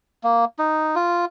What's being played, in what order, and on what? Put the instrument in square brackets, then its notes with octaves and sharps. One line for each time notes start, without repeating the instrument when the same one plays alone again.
[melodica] A#3
D#4
F4